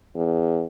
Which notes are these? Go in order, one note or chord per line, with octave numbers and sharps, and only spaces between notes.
E2